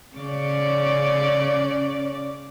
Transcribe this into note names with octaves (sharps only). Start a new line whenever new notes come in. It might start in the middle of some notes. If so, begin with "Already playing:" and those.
C#3 C#4 D5